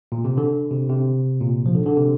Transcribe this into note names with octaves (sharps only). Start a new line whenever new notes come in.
A#2
C3
D3
C3
C3
A#2
F3
D3
D3
C3